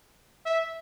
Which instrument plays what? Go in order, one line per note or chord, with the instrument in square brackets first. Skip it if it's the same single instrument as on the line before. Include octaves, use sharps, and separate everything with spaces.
[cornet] E5